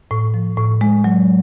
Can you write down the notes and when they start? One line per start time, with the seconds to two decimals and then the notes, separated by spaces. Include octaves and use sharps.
0.11 A2
0.34 F3
0.58 A2
0.81 G#3
1.04 F#3